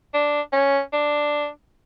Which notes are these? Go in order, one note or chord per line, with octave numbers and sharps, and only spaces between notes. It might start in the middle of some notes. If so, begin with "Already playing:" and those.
D4
C#4
D4